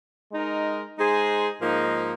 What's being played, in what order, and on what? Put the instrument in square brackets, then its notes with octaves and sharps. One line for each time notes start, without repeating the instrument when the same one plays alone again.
[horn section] G#3 D#4 A#4
G#3 D#4 G#4 C5
G#2 F3 A#3 D#4